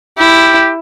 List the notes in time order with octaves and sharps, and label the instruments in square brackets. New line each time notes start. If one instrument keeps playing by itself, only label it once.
[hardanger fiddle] E4 [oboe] G4